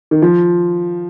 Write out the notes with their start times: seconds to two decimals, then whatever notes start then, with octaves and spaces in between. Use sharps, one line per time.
0.11 D#3
0.22 F3